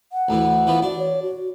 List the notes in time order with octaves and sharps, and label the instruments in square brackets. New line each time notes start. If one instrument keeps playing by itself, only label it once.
[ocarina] F#5
[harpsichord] D2 A2 E3
E3 F3 B3
[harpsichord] D4 [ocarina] F#4
[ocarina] C#5
F#4